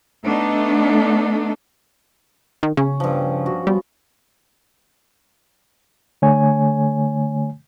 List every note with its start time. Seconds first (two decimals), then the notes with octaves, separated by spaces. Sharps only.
0.25 A3 B3 D4 D#4 A4
2.63 D#3
2.77 C#3 C#4
3.00 G2 F3
3.46 F#4
3.67 G3 B3
6.22 D3 A3 C#5 G#5